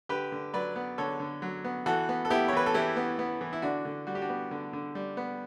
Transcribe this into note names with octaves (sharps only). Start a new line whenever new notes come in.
D3 G4 B4
D3
F#3 B4 D5
B3
D3 A4 C#5
D3
F#3
B3
E3 F#4 A4
B3
A4
B3 E4 G4
C#5
E3 B4
A4
E3 E4 G4
B3
B3
E3
E4
D3 D4 F#4
D3
G3 F#4
G4
D4 F#4
B3
D3
D3
G3
B3